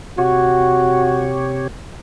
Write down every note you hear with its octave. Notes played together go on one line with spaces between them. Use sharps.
C3 F#4 G4 C#5